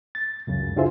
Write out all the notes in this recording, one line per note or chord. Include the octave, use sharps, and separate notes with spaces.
A6
C#2 F#2 C#3
D4 E4 F4 G#4 C5 E5